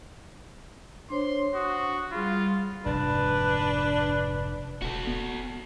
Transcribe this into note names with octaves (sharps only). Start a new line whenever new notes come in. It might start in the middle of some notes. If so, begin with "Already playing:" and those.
D4 C5 C#5 C6
F#4 D#6
G3 F4 G#4 B5
F1 G#2 D4 B4
E1 F#4 A4
B3